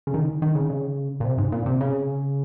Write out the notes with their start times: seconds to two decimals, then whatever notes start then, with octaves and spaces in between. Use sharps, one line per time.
0.07 C#3
0.14 D#3
0.42 D#3
0.55 C#3
0.70 C#3
1.20 A#2
1.25 C3
1.38 G#2
1.52 A#2
1.66 C3
1.81 C#3